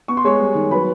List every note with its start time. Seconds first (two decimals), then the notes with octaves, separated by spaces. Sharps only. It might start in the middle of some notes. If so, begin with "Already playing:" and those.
0.08 B3 C#6
0.17 C6
0.24 G#3 C#5 C#6
0.40 G3
0.55 D#3
0.71 F#3 B4 B5